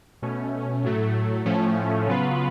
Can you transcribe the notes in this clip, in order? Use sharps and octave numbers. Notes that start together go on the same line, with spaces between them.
B2 A3 C#4
A2 F#3 A3
A2 F3 A3 C#4
C#3 F#3 B3 F4 B4